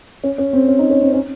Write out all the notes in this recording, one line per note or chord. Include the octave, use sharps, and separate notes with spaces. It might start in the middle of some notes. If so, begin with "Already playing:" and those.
C#4
C#4
C4
C#4
D#4
C#4
C4
C#4